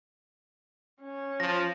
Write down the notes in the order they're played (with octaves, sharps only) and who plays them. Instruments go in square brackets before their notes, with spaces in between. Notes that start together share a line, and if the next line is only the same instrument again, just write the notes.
[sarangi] C#4
[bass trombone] F3 [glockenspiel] A#6